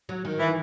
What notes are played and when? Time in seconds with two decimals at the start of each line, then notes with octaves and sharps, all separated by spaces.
0.09 F#3
0.25 D#3
0.39 E3